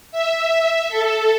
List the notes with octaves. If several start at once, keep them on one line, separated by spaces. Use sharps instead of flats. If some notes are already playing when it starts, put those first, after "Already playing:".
E5
A4